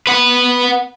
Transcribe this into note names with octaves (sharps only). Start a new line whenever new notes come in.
B4 F#5